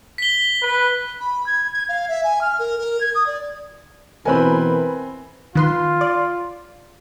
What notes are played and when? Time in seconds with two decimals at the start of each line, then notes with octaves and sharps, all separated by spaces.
0.18 B6 G7
0.62 B4
1.20 B5
1.47 G#6
1.73 G#6
1.89 F5
2.09 E5
2.24 G#5
2.42 F6
2.59 A#4
2.78 A#4
3.01 G#6
3.15 D#6
3.27 D5
4.25 B2 E3 C4 A#4 B4 G#5 B5
5.55 D#3 F4 B4 C6
6.01 D5